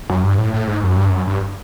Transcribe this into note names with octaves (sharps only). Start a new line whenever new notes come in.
F#2
G2
A2
A2
G#2
F#2
G2
F#2
G2